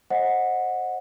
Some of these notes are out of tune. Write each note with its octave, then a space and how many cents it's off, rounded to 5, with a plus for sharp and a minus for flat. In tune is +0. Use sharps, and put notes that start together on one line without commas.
C5 +25 D#5 +0 F#5 -10